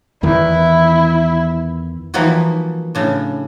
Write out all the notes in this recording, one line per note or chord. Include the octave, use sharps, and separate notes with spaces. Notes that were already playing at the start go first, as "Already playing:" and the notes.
E2 D#3 E3 E4
E3 F3 G3 A#3 D#4 F#4
A2 C#3 D4